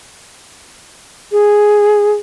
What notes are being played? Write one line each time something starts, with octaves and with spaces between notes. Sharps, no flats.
G#4